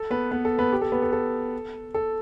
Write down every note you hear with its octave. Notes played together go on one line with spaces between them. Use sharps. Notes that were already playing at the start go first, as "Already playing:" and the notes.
Already playing: A4
B3 B4
B3 B4
A4
B3 B4
G4
A4
B3 B4
A4
A4
A4